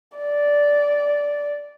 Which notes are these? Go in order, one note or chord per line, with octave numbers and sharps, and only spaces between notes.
D5